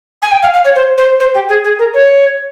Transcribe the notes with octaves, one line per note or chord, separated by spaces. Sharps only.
G#5
G5
F5
F5
C#5
C5
C5
C5
G4
G#4
G#4
A#4
C#5